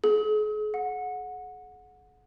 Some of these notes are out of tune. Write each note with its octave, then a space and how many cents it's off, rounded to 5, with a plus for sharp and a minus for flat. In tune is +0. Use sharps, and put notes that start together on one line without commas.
G#4 +40
F#5 -20